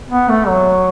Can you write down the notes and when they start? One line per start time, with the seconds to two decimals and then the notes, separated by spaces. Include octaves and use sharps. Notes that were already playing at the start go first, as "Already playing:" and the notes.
0.10 B3
0.29 A3
0.47 F#3